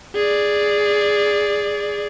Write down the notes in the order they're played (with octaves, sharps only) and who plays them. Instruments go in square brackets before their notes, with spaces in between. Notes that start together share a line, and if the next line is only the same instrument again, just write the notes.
[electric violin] G#4 D5